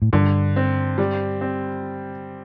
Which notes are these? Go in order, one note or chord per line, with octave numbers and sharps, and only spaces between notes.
A2
G2 D3
C4
G3
C4